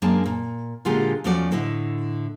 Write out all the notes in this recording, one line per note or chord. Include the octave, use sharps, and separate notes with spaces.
F#2 G#3 A#3 D4 G#5 A5
A#2
A#2 D3 G#3 F4 G4 G#4
E2 F3 A3 C#4 F#4 D5
A2 D3 E4 D#5